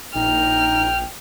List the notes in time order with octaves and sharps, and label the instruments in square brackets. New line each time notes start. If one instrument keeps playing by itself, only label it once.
[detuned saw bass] A#1 [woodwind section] D#4 [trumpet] G5 [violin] F6